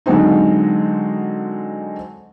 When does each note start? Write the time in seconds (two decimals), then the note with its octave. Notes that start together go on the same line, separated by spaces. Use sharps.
0.06 D3 D#3 F#3 G#3 C4 D#4